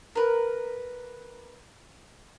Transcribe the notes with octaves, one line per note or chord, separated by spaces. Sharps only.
A#4 B4